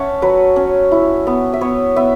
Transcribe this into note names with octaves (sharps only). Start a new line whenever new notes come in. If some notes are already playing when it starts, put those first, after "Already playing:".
Already playing: C#4 C#5 E5 F#5 A5
F#3 B4
C#4
E4
B3
E5
B3 C#5
B3 E5